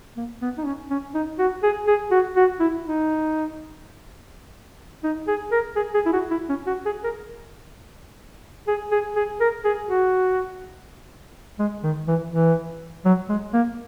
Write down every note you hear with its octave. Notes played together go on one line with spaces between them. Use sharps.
A#3
B3
D#4
C#4
C#4
D#4
F#4
G#4
G#4
F#4
F#4
E4
D#4
D#4
G#4
A#4
G#4
G#4
E4
F#4
E4
C#4
F#4
G#4
A#4
G#4
G#4
G#4
A#4
G#4
F#4
G#3
D#3
E3
E3
F#3
G#3
A#3